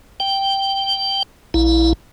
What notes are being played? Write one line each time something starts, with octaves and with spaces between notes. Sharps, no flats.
G5
A#1 E4